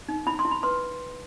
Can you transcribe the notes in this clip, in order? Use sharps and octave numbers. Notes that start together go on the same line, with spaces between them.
D#4
E4 B5
C6
E4
B5
B4 C6